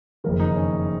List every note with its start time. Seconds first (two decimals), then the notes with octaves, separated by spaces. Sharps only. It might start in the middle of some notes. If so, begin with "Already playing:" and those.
0.24 F#1 F2 D#3 A#4
0.40 D#4
0.56 C#4